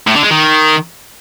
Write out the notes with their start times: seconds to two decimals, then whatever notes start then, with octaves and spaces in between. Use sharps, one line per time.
0.07 A2
0.15 D3
0.23 G#3
0.31 D#3